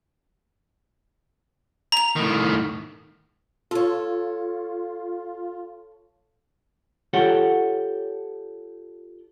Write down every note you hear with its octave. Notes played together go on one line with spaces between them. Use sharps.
A#5 F7
A2 D#3
F4 A4 C#5
F4 G4 A4 C#5 F#5 G5